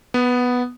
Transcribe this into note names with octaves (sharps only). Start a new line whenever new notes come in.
B3